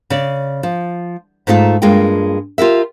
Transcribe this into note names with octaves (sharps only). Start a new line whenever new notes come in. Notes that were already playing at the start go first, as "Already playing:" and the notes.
C#3 D5
F3
G#2 A3 D#4 F4 A5
G2 G#3 A#3 F4 G5
F4 G4 A#4 E5